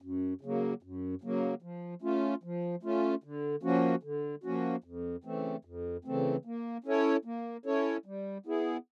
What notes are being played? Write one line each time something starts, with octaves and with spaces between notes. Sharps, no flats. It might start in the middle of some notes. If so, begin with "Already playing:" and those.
F#2
C#3 F#3 A#3
F#2
C#3 F#3 A#3
F3
A3 C#4 F4
F3
A3 C#4 F4
D3
F3 A#3 C#4 F#4
D3
F3 A#3 C#4 F#4
F2
C#3 E3 A3 C4
F2
C#3 E3 A3 C4
A#3
C#4 E4 A4 C#5
A#3
C#4 E4 A4 C#5
G3
B3 E4 G#4